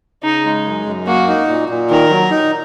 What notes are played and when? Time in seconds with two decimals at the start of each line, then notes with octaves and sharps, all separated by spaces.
0.23 C#3 D#4
0.45 G#3
0.65 F#2
0.86 F#2
1.07 A#3 F#4
1.28 D#4
1.48 A#2
1.69 A#2
1.90 D#3 A#4
2.10 F#3
2.31 D#4